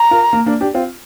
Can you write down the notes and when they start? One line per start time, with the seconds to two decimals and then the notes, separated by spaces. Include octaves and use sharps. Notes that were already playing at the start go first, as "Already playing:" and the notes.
Already playing: A#5
0.11 F4 A#4
0.33 A#3
0.46 A#3 D4
0.61 D4 G4
0.74 C4 F4